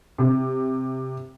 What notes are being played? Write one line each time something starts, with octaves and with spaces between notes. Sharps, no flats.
C3